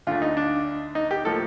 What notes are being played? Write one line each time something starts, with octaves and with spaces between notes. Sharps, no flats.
D2 D3 A3 F4
D#4
D4
D#4
G4
A2 F3 A#3 A4